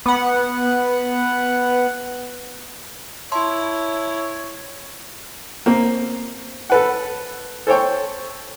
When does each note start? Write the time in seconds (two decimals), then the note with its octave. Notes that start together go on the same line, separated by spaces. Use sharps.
0.06 B3 F#5
3.32 E4 C#5 A5 C6
5.66 A#3 C4
6.70 A4 B4 F#5
7.67 A4 C5 C#5 G5